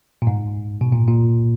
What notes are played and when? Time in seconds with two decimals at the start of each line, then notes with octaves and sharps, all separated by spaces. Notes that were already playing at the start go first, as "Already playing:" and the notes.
0.22 A#2
0.27 G#2
0.81 B2
0.92 A#2
1.08 A#2